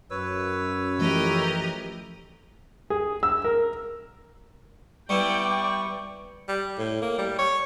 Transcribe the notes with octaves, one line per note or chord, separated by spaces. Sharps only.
F#2 B4 C#5 E6
E3 F3 A3 G4 A#4 D#5
G#4
E6
A#4
G3 B3 E4 D5 G5 C#6
G3
A2
A#3
G3
C#5